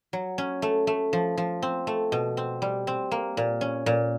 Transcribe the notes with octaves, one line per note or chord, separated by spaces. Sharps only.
F#3
C#4
A3
A3
F3
F3
C4
A3
B2
C4
G3
C4
A#3
A#2
C#4
A#2